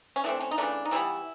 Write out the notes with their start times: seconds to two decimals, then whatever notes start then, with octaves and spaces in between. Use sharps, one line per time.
0.16 C#4
0.24 E3 A3 C4 D4
0.41 C#4
0.51 D#4
0.58 C#3 E3 A3 D4
0.85 D#4
0.91 D3 E3 G3 B3 E4